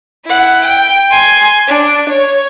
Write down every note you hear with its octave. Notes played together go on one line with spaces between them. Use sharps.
E4 F#5
G5
G#5 C6
D4
C#5